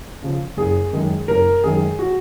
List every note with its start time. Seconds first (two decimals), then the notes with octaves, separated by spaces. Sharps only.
0.23 C#3 F3
0.57 F#1 G#4
0.93 F#2 D#3 G#3
1.28 F#1 A#4
1.64 F#2 D#3 G#3 G#4
1.99 F#4